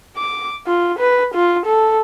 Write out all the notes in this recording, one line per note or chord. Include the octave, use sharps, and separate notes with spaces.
D6
F4
B4
F4
A4